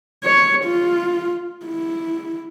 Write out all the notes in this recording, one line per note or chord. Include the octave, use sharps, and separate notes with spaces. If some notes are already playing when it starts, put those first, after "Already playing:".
C#5
F4
E4